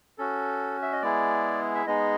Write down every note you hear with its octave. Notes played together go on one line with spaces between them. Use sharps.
C#4 F#4 A4
E5
D#5
G#3 B3 E4 G#4 D5
E5
G#3 B3 D#4 G#4 D#5